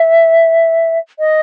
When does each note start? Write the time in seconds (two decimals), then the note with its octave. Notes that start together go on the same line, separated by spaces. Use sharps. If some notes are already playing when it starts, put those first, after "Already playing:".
Already playing: E5
1.19 D#5